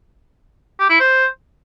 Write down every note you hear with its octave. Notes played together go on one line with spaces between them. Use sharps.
G4
E4
C5